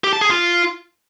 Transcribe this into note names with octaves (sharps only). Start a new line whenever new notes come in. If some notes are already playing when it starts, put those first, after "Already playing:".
G4
A5
G#4
F4